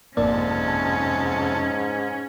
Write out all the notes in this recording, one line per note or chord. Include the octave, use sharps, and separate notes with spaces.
G#1 F2 G#2 C3 A#3 C#4 D5 A5